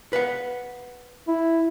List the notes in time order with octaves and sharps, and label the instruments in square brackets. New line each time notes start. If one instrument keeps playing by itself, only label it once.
[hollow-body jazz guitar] B4 F5 F#5
[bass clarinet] E4